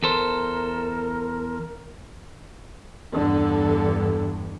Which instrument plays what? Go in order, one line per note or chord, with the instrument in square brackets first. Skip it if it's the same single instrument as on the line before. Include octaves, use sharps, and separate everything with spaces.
[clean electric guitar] E2 A4 C5 [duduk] A#4
[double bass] E2 G2 [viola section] D3 A4